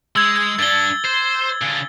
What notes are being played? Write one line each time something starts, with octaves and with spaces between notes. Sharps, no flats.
G#3 E6 G#6
G#6
G2 D4 A6 G7
C5
C#3 D4